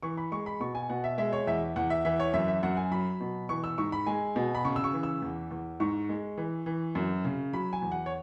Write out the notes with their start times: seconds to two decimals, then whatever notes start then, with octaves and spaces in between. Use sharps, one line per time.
0.03 E3 C#6
0.17 B5
0.32 G#3 C#6
0.46 B5
0.60 B2 C#6
0.75 G#5
0.89 B2 F#5
1.04 E5
1.18 G#3 E5
1.33 C#5
1.47 E2 E5
1.76 E2 F#5
1.90 E5
2.05 E3 E5
2.20 C#5
2.34 F#2 E5
2.48 E5
2.63 F#2 F#5
2.77 G#5
2.91 F#3 B5
3.20 B2
3.49 E3 C#6
3.64 E6
3.78 G#2 C#6
3.92 B5
4.07 G#3 G#5
4.36 B2
4.55 B5
4.65 C#3 C#6
4.76 E6
4.84 C#6
4.93 E3
5.03 E6
5.22 E2
5.51 E2
5.80 G#2 C#6
6.09 G#3
6.38 E3
6.66 E3
6.95 F#2
7.25 C#3
7.53 F#3 B5
7.73 G#5
7.82 E2
7.92 F#5
8.06 C#5